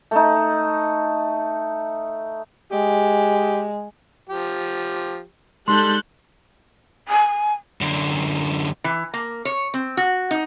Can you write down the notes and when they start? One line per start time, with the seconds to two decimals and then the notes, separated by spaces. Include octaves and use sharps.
0.11 A3 D#4
2.72 G#3 G4
4.30 F3 G4
5.68 G3 G#3 D#4 A4 C6 F#6 G6
7.08 G#5
7.81 F#2 D3
8.84 E3
9.14 A#3
9.45 C#5
9.74 C4
9.97 F#4
10.31 D#4